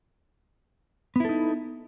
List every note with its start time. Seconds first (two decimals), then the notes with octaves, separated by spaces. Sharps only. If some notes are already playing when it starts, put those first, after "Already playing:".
1.16 B3
1.20 E4
1.25 A4
1.29 D#4